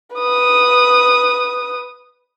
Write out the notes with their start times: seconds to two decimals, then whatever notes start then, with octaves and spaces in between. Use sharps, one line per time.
0.15 B4 D#6